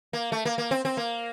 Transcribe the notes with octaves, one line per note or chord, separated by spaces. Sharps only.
A#3
A3
A#3
A#3
C4
C4
A#3